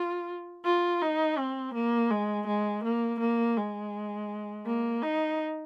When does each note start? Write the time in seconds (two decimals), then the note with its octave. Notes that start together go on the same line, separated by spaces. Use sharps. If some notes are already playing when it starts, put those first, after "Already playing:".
Already playing: F4
0.65 F4
1.02 D#4
1.38 C4
1.74 A#3
2.11 G#3
2.47 G#3
2.84 A#3
3.20 A#3
3.57 G#3
4.67 A#3
5.03 D#4